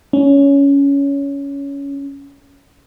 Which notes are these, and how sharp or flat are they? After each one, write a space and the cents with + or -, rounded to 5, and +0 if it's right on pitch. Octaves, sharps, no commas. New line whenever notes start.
C#4 +15